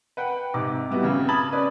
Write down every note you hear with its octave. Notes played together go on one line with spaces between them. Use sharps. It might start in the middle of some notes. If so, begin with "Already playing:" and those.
B4 F#5 G5
G#2 C3 D6
G3 B3 E4 F#4 G4
G#1 C#3
A5 B5 D#6 G#6 A6 F#7
C#4 B4 D5